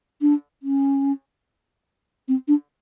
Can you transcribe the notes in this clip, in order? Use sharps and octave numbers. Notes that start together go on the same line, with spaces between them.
D4
C#4
C4
D4